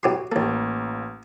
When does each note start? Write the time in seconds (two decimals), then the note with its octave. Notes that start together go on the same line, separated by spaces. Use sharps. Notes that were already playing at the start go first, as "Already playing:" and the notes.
0.03 B1 F#4 G4 C6
0.32 A1 D#2 A#3 A4